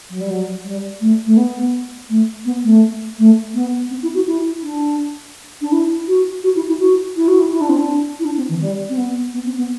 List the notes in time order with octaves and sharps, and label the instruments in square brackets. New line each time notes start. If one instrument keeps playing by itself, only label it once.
[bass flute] F#3
G3
F#3
G3
A3
A3
B3
A3
B3
A3
A3
B3
C4
E4
F#4
E4
D4
D4
E4
F#4
F#4
E4
E4
F#4
E4
F#4
E4
E4
D4
C4
D4
E4
D4
C4
E3
G3
C4
B3
B3
C4
B3